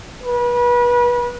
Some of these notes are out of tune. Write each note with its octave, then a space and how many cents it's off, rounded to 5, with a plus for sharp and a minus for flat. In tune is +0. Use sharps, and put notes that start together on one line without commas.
B4 -30